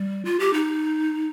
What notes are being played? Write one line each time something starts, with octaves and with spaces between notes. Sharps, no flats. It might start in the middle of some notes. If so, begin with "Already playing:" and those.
Already playing: G3
F4
G4
D#4